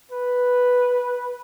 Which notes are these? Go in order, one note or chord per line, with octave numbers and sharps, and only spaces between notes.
B4